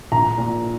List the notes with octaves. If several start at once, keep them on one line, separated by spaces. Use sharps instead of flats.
A#1 A#5
A#2